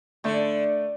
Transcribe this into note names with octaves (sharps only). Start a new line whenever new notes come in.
D3 A3